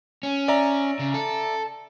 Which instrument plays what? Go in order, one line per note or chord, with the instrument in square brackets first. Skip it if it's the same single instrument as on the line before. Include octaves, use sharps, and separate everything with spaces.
[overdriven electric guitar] C#4
[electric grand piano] D5 E5 A#5
[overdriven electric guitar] C#3
A4